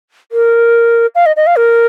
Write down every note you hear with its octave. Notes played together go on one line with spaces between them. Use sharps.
A#4
F5
D#5
D#5
F5
A#4